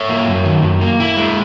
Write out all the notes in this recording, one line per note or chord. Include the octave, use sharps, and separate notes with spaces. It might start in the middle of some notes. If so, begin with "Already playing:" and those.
Already playing: C#5 E5
A#3
F#2
D#3
F#2
A#3
E4
G#3